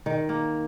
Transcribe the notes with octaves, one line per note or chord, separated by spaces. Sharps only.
D#3
A#3